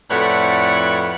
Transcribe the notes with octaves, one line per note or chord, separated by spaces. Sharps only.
F2 A2 B4 C#5 D5 F#5